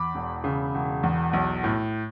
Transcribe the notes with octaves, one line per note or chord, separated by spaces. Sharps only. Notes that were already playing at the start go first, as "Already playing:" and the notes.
Already playing: E2 B5 D6
E1
C#3
E1
E2
B1
A2